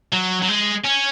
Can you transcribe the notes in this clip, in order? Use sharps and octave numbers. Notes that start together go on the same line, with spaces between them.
F#3
F#3
G#3
C#4